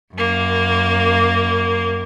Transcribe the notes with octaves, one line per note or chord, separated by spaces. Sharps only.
F#2 A#3